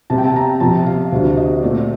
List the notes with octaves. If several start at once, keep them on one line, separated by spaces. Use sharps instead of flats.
C3 G3 C4 A5
G5
A5
A#5
F2 C3 G3 A5
F5
D2 C3 G3 D4 F5
D#5
A#2 A3 C4 D5